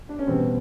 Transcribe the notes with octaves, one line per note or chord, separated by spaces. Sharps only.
D4
C#4
E2 B2 G3 C4